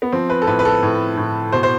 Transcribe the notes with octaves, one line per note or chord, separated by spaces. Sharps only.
B3
F3 C4
B4
A4
A2 B4
B4
A4
A2
A2
B2 C5
C5